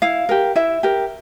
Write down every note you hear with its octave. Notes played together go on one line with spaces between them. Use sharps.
E4 F5
G4 A#4
E4 E5
G4 A#4